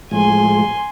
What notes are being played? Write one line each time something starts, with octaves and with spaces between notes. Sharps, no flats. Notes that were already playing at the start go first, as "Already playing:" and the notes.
A2 F3 G#3 G#5 C6